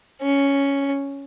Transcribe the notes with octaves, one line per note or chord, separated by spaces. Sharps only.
C#4